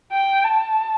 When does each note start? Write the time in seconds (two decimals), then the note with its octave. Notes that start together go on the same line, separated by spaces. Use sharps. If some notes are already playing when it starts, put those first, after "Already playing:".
0.12 G5
0.44 A5